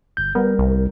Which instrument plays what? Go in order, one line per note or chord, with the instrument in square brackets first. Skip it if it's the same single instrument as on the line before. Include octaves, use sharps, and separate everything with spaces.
[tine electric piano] G1 G6
[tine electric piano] G3 A#4 [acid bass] B3
[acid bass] C2